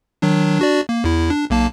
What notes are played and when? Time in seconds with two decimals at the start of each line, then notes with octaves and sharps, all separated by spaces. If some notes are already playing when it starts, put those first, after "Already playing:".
0.22 D#3 F#3 D4
0.59 D4 F#4 D5
0.89 A#3
1.04 E2 E4
1.30 D4
1.50 B1 A#3 A5